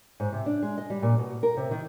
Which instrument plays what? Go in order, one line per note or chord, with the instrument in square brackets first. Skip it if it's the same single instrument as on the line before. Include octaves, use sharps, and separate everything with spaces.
[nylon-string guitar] G#2
C3
D4
G#3
D#5
G3
A#2
B2
A#4
C3
D#3